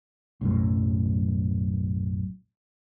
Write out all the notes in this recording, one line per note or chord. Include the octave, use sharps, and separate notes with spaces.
B1 F#2 A2